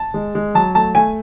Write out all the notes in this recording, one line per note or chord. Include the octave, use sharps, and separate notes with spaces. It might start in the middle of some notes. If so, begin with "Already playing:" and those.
Already playing: A5
G#3
G#3
F#3 A5
A3 A5
A3 G#5